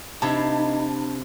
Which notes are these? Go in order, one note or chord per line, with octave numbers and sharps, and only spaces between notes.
C3 F3 D4 D#4 A5 B5 G#6